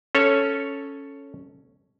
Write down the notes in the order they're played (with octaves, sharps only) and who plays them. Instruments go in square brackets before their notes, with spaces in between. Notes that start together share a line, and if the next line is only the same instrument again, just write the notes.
[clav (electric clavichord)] C#4 A4 C#5